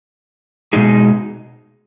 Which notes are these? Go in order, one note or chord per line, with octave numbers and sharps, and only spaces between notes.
B2 G#3 D#4 G#4